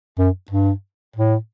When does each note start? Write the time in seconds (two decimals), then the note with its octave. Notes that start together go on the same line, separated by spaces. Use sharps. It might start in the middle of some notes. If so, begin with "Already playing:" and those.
0.19 F#2
0.51 G2
1.16 A2